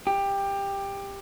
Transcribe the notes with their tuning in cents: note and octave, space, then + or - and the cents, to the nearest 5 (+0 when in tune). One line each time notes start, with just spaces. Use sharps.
G4 +15